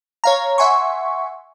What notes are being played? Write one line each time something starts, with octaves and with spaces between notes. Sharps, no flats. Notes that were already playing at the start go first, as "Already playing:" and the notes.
C#5 F5 A#5
E5 F#5 G#5 C6 C#6